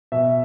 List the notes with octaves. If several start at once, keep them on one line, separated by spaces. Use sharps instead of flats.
B2 E5